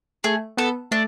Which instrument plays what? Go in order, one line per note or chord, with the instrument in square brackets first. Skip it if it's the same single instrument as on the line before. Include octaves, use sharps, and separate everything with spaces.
[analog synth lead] A3 [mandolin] G#4
[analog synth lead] B3 [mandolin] A4
[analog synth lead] A3 [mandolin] D4